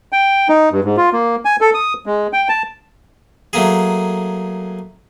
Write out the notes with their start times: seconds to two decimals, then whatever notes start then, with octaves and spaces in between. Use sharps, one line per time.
0.12 G5
0.49 D#4
0.72 G2
0.84 G#2
0.97 F4
1.13 A#3
1.45 G#5
1.61 A4
1.74 D#6
2.06 G#3
2.33 G5
2.49 A5
3.53 F#3 A3 A#3 G#4